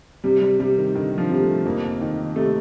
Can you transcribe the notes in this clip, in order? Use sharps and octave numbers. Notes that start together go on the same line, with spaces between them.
C3 G3
G3
C3 G3
D#3
D3 D#3
F3
C3
A3
F2 A#3
D#3
C3 A3